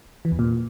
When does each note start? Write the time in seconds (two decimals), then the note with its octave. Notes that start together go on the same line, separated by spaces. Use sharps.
0.25 E3
0.32 E2
0.39 A#2